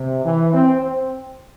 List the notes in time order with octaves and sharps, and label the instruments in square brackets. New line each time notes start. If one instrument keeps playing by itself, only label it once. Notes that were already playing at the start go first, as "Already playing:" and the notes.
Already playing: [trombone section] C3
E3
C4
C4